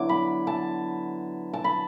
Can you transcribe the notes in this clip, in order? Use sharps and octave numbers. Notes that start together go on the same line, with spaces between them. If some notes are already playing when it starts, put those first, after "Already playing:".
Already playing: D3 F#3 B3 E4 D6
B5
A5
A5
B5